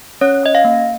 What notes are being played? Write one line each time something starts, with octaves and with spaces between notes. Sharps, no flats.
C#4 C#5
C#4 D#5
F5
A#3